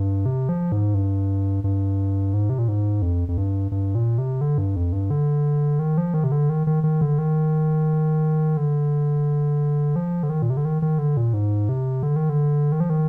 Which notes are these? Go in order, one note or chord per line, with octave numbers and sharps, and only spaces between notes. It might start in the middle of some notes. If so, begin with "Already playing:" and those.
Already playing: G2
C3
F3
G#2
G2
G2
G#2
C3
A#2
G#2
F2
F2
G2
G2
A#2
C3
D3
G2
F2
G2
D3
D#3
F3
D#3
C3
D3
D#3
D#3
D#3
D3
D#3
D3
F3
D3
D#3
A#2
C3
D3
D#3
D#3
D3
A#2
G#2
C3
D3
D#3
D3
D#3
F3
D#3